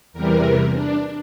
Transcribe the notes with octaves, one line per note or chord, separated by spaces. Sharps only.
E2 C3 E3 G3 A#4
D4